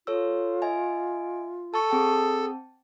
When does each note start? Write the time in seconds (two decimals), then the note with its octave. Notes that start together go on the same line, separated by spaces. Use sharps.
0.07 F4 A4 C#5 E6
0.62 D#5 E5 G#5
1.74 A4 A5 C#6
1.90 C4 G#4 G5 A5